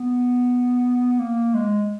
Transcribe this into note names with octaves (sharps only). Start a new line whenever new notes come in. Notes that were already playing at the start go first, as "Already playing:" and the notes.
Already playing: B3
A#3
G#3